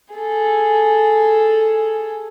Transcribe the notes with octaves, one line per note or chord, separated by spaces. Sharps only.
G#4 A4